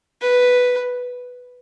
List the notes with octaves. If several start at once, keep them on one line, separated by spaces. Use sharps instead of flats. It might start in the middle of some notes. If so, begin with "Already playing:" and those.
B4